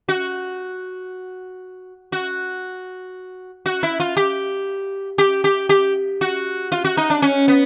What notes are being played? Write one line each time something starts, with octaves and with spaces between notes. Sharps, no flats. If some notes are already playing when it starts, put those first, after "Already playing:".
F#4
F#4
F#4
E4
F4
G4
G4
G4
G4
F#4
F4
F#4
D#4
D4
C#4
B3